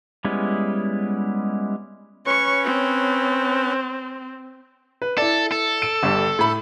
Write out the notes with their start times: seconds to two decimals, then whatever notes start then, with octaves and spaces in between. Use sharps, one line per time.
0.24 G3 G#3 B3 C#4 E4
2.26 C#4 B4 C#5 C#6
2.64 C4
5.02 B4
5.18 E4 A4 D5
5.52 A4
5.82 D7
6.03 G1 G3
6.39 A2 B5